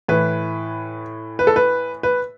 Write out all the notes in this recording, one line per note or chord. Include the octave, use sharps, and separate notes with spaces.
A2 E3 B4
B4
A4
B4
B4